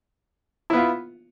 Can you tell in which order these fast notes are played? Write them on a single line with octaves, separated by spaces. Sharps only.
E4 B3 F4